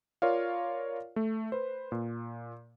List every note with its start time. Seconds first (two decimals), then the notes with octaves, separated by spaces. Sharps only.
0.22 F4 A#4 C#5 D5 F5
1.16 A3
1.52 B4 C5
1.92 A#2